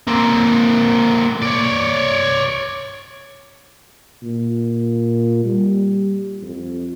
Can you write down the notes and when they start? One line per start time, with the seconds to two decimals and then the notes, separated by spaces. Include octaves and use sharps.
0.08 A#3 C4
1.43 C#5 D5
4.22 A#2
5.45 G3
6.42 F2